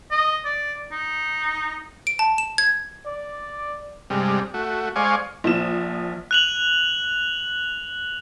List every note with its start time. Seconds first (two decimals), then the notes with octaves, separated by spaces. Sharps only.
0.11 D#5
0.45 D5
0.92 D#4
2.07 D7
2.19 A5
2.38 E7
2.58 G#6
3.06 D5
4.10 G2 C3 G3 G#3
4.54 A3 F#4
4.96 G#3 C5 D5 F5 G#5 C#6
5.44 A#1 F3 E7
6.31 F#6 F7 F#7